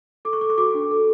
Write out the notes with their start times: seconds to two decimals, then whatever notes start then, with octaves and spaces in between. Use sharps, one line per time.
0.25 A4 D6
0.33 C#6
0.41 A4 D6
0.50 C#6
0.57 F#4 D6
0.75 D4
0.91 A4